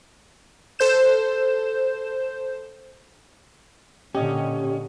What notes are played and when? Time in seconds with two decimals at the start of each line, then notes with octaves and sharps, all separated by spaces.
0.79 A4 C5 G6 E7
4.15 A#2 D3 C#4 G4 D#5